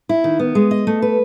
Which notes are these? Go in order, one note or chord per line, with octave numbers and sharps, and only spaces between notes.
E4
D#3
B3
G#3
D#5
A3
B4